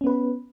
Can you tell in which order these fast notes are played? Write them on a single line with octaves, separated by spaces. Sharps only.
C#4 B3 B4